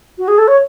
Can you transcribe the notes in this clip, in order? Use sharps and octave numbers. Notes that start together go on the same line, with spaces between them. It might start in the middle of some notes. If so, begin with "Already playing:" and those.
F#4
G#4
A4
C#5